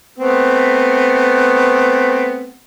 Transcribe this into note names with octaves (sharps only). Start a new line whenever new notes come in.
A3 B3 C4